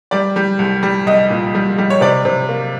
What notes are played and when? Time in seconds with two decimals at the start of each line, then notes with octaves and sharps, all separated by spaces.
0.11 G3 D5
0.36 G3
0.59 C2
0.83 G3
1.07 C2 D#5
1.30 A#2
1.55 G3
1.78 G3
1.90 C#5
2.01 C3 D5
2.25 C3
2.49 A#3